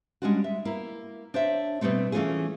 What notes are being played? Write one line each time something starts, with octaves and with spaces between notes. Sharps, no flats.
G3 G#3 C#4 D4 F4 F#4
E5
A#3 E4
D4 C5 C#5 E5
B2 E3 G3 A3 C4
E3 A3 C#4 F4 G#4